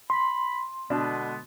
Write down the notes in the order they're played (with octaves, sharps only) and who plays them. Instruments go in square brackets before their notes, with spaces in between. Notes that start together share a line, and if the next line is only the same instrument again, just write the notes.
[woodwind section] B5 [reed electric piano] C6
[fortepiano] B2 D4 [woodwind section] D3 G#3 B3